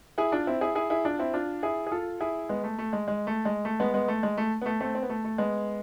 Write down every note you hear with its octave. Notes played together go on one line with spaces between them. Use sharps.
E4 G#4
D4 F4
C4 E4
E4 G#4
E4 G#4
E4 G#4
D4 F4
C4 E4
D4 F4
E4 G#4
G#4
F4 A4
E4 G#4
G#3 B3
A3
A3
G#3
G#3
A3
G#3
A3
G#3 B3
G#3 B3
A3
G#3
A3
B3
A3
A3 C4
C4
B3
A3
A3
G#3 B3